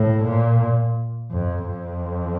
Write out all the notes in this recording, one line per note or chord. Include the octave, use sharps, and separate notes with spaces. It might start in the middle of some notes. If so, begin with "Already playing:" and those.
Already playing: A2
A#2
F2
F2